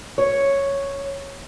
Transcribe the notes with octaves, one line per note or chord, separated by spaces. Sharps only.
C#5